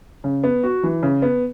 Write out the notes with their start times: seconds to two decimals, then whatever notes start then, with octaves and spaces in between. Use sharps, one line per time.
0.24 C#3
0.43 B3
0.63 F#4
0.83 E3
1.03 C#3
1.22 B3